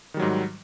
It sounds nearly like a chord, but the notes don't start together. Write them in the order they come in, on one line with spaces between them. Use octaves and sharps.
D#3 G3 F#3 G#2